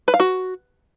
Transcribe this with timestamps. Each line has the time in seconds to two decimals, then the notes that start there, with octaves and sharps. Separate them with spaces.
0.08 B4
0.14 F5
0.20 F#4